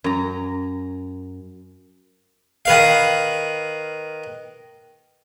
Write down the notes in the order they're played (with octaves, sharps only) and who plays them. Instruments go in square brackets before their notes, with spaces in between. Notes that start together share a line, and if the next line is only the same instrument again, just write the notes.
[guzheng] F#2 A#5
[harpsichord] D#3 B4 F5